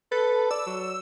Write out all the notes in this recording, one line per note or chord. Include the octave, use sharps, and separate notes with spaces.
A4 B4
D5 E6
F#3